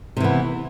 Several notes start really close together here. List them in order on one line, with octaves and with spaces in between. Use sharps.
C3 E3 B3